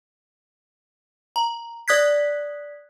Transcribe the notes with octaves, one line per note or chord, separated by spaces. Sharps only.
A#5
D5 D#6 F#6 G#6 B6